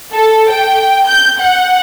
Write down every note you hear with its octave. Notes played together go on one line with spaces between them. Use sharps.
A4
G5
G6
F#5